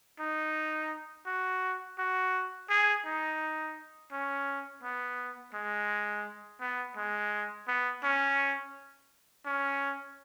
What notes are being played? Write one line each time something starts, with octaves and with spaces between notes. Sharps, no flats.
D#4
F#4
F#4
G#4
D#4
C#4
B3
G#3
B3
G#3
B3
C#4
C#4